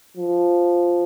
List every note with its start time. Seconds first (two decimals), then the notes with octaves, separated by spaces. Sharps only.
0.17 F3